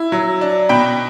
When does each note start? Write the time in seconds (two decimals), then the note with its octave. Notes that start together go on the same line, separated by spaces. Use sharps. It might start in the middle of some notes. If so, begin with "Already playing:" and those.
Already playing: E4
0.12 F#3
0.41 D4
0.69 B2 G5 B5